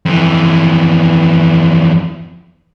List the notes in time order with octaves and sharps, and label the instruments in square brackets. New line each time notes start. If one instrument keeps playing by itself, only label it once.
[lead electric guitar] F2 E3